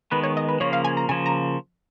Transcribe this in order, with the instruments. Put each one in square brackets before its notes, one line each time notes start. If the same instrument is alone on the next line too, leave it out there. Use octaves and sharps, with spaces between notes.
[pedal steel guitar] D#3 G#3 B3 [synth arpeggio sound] B4
[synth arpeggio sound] C#5
D#5
B4
[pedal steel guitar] C#3 F3 A#3 [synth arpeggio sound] C#5
[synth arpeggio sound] F5
G#5
A#5
[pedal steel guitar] C#3 F3 A#3 [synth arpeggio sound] G#5
[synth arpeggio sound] A#5